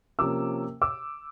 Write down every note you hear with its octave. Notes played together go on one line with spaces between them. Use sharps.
C3 F3 A#3 C#4 D6 E6
D6 E6